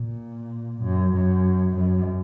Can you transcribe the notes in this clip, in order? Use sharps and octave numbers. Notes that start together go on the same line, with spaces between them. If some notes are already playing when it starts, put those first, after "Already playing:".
Already playing: A#2
F#2
F#2
F#2